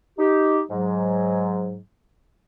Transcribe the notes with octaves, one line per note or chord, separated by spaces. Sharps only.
D#4 G4
G#2 F#3